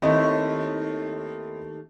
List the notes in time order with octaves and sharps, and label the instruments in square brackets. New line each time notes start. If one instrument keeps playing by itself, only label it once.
[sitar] D#2 A3 [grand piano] C4 E4 D#5